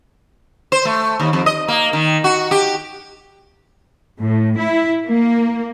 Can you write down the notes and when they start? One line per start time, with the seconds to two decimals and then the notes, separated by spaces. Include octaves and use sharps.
0.72 C5
0.85 A3
1.20 D#2
1.33 F2
1.46 D#5
1.68 A#3
1.93 D#3
2.24 F#4
2.51 G4
4.20 A2
4.57 E4
5.08 A#3